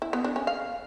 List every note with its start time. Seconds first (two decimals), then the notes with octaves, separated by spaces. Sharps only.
0.02 E4
0.13 B3
0.24 D4
0.36 C#4
0.47 F5